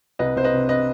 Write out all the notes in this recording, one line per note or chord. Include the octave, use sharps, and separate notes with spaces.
C2 B4 D#5
C2 C5
B4 D#5
C3
B4 D#5